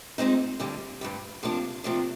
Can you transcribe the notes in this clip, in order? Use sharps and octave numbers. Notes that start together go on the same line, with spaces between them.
A#2 G#3 C4 D#4
G2 D3 G3
G2 D3 G3
C3 F3 A#3 D4
C3 F3 A#3 D4